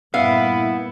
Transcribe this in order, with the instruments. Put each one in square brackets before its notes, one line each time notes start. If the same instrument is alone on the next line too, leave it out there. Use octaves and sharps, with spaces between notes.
[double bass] G2 A#2 [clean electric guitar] B3 [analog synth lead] E4 [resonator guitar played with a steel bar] F5